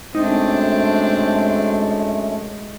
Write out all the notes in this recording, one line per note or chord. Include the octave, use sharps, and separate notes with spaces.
F#2 G#3 A3 C4 D4 D#4